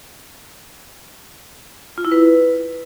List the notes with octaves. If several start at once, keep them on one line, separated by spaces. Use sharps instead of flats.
F4
E4
B4